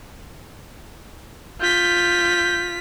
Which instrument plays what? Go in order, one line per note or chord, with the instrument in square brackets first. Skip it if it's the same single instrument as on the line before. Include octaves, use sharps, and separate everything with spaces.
[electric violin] F4 B6 [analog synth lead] G6